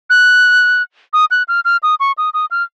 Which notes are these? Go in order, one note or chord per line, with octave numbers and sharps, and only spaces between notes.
F#6
D#6
F#6
F6
F6
D#6
C#6
D#6
D#6
F6